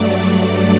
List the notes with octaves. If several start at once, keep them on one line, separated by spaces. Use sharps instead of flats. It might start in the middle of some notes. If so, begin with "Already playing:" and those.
Already playing: G2 F#3 A3 D5